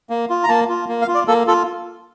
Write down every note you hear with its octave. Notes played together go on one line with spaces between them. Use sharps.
A#3
F4
A#5
A#3 A5
F4
A#3
F5
F4
D5
A#3 A4
F4 A4